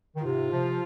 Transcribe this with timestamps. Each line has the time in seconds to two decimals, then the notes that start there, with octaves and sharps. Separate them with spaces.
0.16 D#3
0.24 G#2 C3 F4
0.52 C3 F3